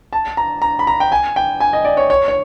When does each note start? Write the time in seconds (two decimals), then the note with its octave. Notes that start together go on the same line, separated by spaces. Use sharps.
0.13 A5
0.37 A#5
0.62 A#5
0.79 B5
0.87 A#5
1.00 G5
1.12 G#5
1.36 G5
1.60 G#5
1.73 D#5
1.85 D5
1.97 C#5
2.10 C#5
2.28 C#5